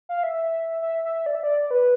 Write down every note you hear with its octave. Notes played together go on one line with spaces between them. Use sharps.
F5
E5
E5
E5
D5
E5
D5
B4